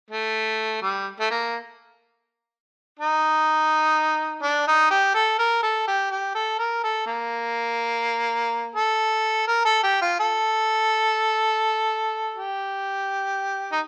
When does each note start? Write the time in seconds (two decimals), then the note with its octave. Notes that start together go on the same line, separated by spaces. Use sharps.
0.10 A3
0.82 G3
1.20 A3
1.31 A#3
2.99 D#4
4.43 D4
4.67 D#4
4.91 G4
5.14 A4
5.39 A#4
5.63 A4
5.87 G4
6.11 G4
6.35 A4
6.59 A#4
6.84 A4
7.07 A#3
8.75 A4
9.47 A#4
9.65 A4
9.83 G4
10.01 F4
10.20 A4
12.35 G4
13.72 D#4